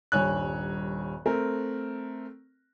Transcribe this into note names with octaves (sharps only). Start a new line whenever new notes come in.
D#1 G2 C#5 G#5 F#6
A3 C4 A#4